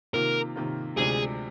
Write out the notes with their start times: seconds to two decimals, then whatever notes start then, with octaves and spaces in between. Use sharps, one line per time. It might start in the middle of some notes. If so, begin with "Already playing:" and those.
0.14 C3 D#3 A#3 F4 A#4
0.56 C3 D#3 A#3 F4
0.96 D2 C3 F3 G#3 D4 G#4